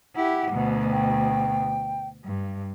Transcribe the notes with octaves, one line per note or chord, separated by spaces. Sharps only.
E4 G4 F#5
D2 B2
G5
G2